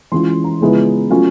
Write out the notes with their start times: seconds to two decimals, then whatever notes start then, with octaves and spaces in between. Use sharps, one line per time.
0.12 E3 G#3 C#4 F4 C6
0.44 A#5
0.61 C#3 F3 G#3 B3 E4
1.10 F#3 A3 C#4 F4